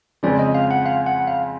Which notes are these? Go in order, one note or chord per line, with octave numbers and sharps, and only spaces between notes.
F2 C#3 F3 G#3 C4 D5
D#5
F5
F#5
F5
F#5
F5